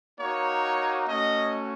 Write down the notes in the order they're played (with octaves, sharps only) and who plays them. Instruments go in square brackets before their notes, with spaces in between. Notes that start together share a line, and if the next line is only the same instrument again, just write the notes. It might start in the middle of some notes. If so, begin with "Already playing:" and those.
[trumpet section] A#3 D#4 F#4 C#5
A3 C#4 F#4 D#5